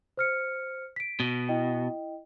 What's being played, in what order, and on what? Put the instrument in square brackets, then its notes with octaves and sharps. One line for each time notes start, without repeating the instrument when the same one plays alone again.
[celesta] C5 F6 C#7
B6 D7
[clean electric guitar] B2
[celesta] E4 D#5 G5